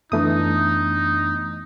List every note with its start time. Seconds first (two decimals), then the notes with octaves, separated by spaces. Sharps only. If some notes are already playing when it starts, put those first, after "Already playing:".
0.12 F#2 E3 A3 B3 D4 D#4 D#6